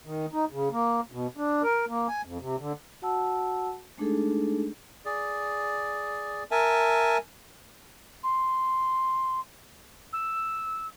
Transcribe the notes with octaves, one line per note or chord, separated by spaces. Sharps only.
D#3
D#4
C#3
A#3
B2
D4
A#4
A#3
G#5
F2
C3
D3
F#4 F#5 A5 E6
G#3 A3 D4 D#4 G#4 A4
G#4 D5
A#4 E5 G#5 A5
C6
E6